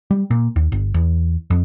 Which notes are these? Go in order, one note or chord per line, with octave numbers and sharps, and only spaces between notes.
G3
A#2
D#2
G1
E2
F2